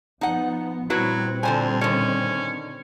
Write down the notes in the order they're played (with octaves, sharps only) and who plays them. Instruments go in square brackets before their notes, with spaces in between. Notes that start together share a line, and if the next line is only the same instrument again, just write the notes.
[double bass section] F3 B3 [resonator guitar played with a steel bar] D#4 F#5
[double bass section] A#2 G3 C4 [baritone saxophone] F#3 [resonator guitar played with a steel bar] E4 F#4 B4
[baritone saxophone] F2 [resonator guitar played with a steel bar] D3 C5 G#5
[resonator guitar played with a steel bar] D3 D#3 [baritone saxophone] C#4